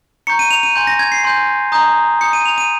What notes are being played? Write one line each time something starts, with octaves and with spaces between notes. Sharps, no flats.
A#5 C#6 G6 C#7
D#7
F7
D#7
G#5 C6 G6
A#6
G#6
C7
G#5 C6 G6
A#5 D#6 G6
A#5 D#6 G6 C#7
D#7
F7
D#7